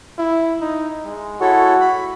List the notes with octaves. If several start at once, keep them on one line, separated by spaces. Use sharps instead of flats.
E4
D#4
G#3
E4 F#4 A4 C#5
B5